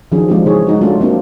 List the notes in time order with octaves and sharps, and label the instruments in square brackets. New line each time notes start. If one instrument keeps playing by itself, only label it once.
[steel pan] D#3 F3 F#3 C#4 D4 G#4
F3 G#3 C4 D4 F4 G4
C#3 E3 G#3 D#4 G#4 C#5
G#3 D#4 F#4
F#3 A3 C#4 D4 F4
F#3 A#3 C4 D4